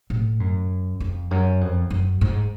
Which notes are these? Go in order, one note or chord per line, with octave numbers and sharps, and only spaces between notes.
A2
F#2
F2
F#2
F2
F#2
G#2